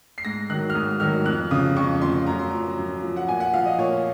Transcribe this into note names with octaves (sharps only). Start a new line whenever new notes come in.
C7
G#2 A#6
D#3 F#3 F#6
F6
G#2 D#6
D#3 F#3 F6
F2 F#6
C#3 F3 D#6
F2 C#6
C#3 F3 C6
F#2 A#5
C6
F3 A#5
F#2
F3
F#5
A#2 G#5
F#5
F3 F5
D#5
A#2 C#5